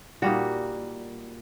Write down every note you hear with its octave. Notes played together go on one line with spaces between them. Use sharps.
A#2 G3 A#3 D#4 F#4